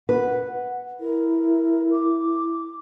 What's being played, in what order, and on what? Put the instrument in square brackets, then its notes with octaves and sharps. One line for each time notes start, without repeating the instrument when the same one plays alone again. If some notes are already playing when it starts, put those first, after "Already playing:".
[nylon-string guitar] B4 [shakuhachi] F#5
[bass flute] E4 [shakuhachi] A#4
[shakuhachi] D6